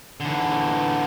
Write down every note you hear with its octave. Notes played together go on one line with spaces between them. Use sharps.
D3 E3